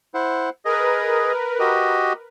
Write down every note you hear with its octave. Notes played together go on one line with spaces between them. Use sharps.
E4 C5 F#5
G#4 A#4 B4 D#5
F#4 G4 D#5